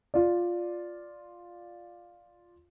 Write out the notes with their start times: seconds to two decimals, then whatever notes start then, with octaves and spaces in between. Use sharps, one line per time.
0.14 F4 D5